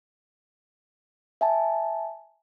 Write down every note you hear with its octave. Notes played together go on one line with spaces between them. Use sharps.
E5 G#5 A5